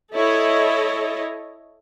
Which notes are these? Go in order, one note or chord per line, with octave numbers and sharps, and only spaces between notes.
E4 A4 C#5 D#5